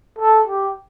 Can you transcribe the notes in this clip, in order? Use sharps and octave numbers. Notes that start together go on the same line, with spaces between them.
A4
G4